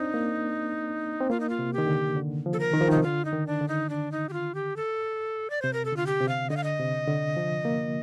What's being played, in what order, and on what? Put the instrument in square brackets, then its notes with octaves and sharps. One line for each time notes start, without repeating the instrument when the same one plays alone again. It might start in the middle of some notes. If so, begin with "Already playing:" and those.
Already playing: [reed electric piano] C4 D4 [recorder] D#4
[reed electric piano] A#3
C4
[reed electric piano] A#3 [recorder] F4
[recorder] D#4
F4
[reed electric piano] C3
[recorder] G4
[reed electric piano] D#3
D3
D3
F3
[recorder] A4
A#4
[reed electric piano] D#3
F3
[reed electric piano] D#3 [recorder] D#4
[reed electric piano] C3
[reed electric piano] D3 [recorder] F4
[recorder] D#4
[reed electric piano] D#3
[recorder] D4
[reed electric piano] D3
[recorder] D#4
D4
D#4
G4
F4
G4
A4
D5
[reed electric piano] C3 [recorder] C5
[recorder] A#4
A4
[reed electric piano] D3 [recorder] F4
[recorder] G4
[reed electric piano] C3
[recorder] F5
[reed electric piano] D3 [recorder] D#5
[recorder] F5
D#5
[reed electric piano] C3
D3
F3
A#3